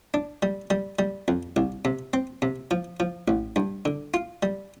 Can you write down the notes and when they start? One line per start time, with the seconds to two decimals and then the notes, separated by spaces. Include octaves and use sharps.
0.14 D4
0.42 G3
0.70 G3
0.99 G3
1.28 F2
1.56 C2
1.85 C3
2.13 C4
2.42 C3
2.71 F3
3.00 F3
3.28 A1
3.56 G2
3.85 D3
4.14 F4
4.43 G3